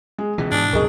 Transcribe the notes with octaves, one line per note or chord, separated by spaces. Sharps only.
G#3
C#2 B2 E3
G#2 D4 G#5 A5 D#6
E1 C2 F#2 A2 G#4 A#4 D#5 C#6